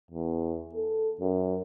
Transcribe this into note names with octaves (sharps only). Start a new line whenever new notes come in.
E2
A4
F#2